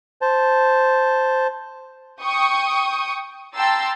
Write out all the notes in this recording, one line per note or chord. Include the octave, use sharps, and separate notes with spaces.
C5 A5
G5 C#6 D#6
G5 A5 A#5 C6 E6 A6